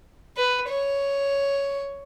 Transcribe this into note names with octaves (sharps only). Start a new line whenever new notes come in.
B4
C#5